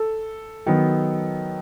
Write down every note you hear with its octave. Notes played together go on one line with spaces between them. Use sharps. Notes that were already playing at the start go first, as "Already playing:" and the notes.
Already playing: A4
D#3 F#3 B3